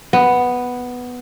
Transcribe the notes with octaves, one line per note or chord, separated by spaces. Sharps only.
B3